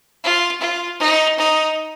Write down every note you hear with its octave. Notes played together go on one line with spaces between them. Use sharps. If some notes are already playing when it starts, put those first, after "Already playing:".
F4
F4
D#4
D#4